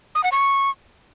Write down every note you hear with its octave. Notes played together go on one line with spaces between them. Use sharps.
D#6
F#5
C#6